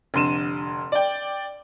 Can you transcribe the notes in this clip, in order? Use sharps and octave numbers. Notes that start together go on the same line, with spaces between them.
F1 D3 C6 D#7 E7
D5 G5